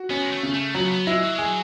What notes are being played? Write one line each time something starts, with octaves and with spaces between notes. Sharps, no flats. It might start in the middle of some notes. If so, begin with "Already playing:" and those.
Already playing: F#4
B3 C#4
G#3
A3
C#3
A3
F#3 B3
A3
B3
G#3 E4
F#3
G#3 G#4
F#3